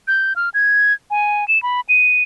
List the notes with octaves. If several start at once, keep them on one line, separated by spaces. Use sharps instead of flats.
G6
F6
G#6
G#5
E7
B5
D#7